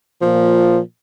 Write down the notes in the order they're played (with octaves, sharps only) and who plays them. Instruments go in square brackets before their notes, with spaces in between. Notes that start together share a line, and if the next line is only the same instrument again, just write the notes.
[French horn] A#2 [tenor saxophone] F3